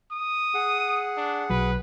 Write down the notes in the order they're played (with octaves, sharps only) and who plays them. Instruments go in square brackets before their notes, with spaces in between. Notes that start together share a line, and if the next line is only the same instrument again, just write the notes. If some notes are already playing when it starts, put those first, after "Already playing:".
[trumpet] D#6
[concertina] G#4 F#5
[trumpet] D4
[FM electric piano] B1 F#3 [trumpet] B4